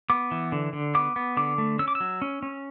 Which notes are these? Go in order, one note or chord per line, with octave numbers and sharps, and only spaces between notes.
B3 D6
E3
D3
D3
B3 D6
B3
D3 D6
A3
C#4 E6
D6
E6
F#3
C#4
C#4